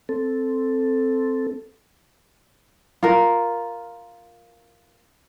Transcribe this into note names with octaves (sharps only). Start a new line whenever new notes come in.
C4 A4
F4 A#4